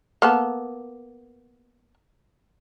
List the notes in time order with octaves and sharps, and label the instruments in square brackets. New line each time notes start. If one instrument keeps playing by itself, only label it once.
[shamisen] A#3 B3 A4